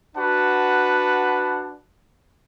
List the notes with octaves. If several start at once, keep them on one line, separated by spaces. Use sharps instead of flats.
D4 F#4 B4 F#5 A5